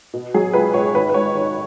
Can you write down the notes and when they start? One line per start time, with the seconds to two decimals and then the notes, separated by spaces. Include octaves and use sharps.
0.13 B2
0.34 F#3 G#4
0.53 C#2 B4
0.74 C#2 C#5
0.94 G#1 B4
1.09 B4
1.14 G#2 C#5
1.34 G#1